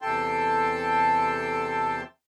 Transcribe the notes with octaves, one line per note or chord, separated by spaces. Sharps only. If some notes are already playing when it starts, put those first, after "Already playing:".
E2 C3 A4 G5 A5 C6